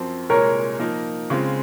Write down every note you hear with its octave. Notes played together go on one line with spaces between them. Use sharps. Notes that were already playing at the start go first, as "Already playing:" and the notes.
Already playing: F#2 F3 C4
C2 A#2 G#3 A#4 C#5
F3 A#3 D#4 A#4
C#3 G#3 C4 F4